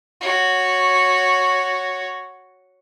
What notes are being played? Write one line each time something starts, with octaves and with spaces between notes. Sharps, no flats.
F#4 C#5